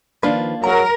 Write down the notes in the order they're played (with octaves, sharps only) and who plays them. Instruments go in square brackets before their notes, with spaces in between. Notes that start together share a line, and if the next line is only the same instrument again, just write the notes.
[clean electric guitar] D#3 F3 B4 [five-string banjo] A#3 D4 F4
[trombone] F#3 [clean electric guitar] G#4 A#5 [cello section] A#4